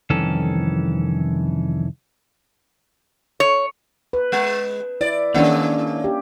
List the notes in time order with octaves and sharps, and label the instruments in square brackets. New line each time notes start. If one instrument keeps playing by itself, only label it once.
[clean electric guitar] C2 F2 D#3 E3 C#4 A4
[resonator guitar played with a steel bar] C#5
[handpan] B4
[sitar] G#3
[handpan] E4 [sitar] D5
[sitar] D#3 G#3 [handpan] A#3 C#4 D4
[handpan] G4